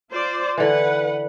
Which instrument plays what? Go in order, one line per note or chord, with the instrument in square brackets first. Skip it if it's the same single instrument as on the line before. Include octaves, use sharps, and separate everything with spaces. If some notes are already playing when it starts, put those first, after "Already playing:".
[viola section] F4 C5 D5
[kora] D3 E3 [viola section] B4 F#5